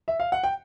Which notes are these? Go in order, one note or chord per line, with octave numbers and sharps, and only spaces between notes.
E5
F5
F#5
G5